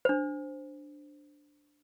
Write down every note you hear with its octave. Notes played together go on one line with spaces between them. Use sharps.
D4 C5